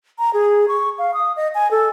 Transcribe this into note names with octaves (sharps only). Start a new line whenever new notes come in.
A#5
G#4
C#6
F5
D#6
D#5
G#5
A4